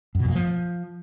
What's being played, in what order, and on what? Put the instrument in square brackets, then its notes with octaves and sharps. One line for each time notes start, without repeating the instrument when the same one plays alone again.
[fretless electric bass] F#2
B2
F2
A#3
F3